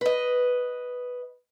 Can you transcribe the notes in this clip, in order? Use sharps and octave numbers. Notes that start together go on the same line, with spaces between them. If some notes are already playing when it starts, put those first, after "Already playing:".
B4 D#5